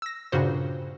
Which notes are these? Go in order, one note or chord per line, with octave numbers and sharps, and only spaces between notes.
E6 A#6
G2 A#2 C#3 F#4 C5